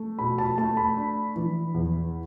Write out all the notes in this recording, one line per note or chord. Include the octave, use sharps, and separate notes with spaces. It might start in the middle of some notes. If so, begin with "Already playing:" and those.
Already playing: A3
B2 B5
A5
A3 A5
B5
D4
E3
E2